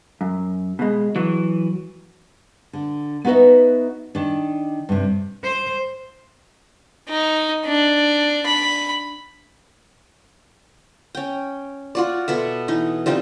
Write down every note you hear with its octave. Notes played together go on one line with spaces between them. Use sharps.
F#2
B2 G#3
E3 F#3
D3
B3 D#4 F#4 B4 D#5 E5
D#3 D4
G2 C3
C5
D#4
D4
B5
C#4 G5
F4 F#4 D5
B2 B3 A4 E5
E3 D#4
G3 C4 D#4 F4